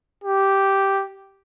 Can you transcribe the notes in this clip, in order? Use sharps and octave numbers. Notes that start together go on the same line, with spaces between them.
G4